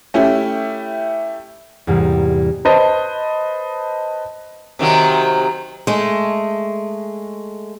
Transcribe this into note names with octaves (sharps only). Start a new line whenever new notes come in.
A3 C#4 E4 G4
E2 G#2 C3 E3 G3 A#3
B4 C5 D#5 A5
C3 D#3 F#3
G#3 A3